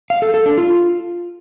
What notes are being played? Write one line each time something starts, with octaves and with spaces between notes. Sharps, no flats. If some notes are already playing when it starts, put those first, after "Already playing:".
F5
A4
A4
D4
F4